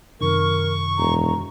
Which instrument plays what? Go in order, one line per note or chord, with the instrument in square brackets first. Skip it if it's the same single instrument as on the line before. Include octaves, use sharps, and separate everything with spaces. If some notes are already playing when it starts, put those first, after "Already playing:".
[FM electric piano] F#2 C3 D#3 [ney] A#4 [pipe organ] C#6
[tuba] E1 [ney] A#5